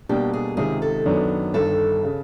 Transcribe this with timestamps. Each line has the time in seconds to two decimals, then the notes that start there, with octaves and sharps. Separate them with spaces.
0.09 B2 G3 A#3 D4 G4
0.33 G#4
0.57 C#2 C3 D#3 G#4
0.82 A4
1.05 F#2 D#3 F#3 B3 D4
1.54 G1 G2 D#3 A4
2.05 C#3